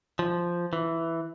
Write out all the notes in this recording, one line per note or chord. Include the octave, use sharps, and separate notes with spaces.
F3
E3